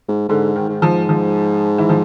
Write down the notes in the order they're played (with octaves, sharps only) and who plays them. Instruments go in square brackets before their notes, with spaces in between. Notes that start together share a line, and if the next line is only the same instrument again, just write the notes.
[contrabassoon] G#2
[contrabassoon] G#2 [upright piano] D3
[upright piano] D#3
[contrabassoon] G#2
[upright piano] F3
F3
E3
F3